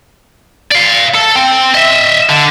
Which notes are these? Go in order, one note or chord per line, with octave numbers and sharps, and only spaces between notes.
D5 F5
A4
C4
D#5 E5
D3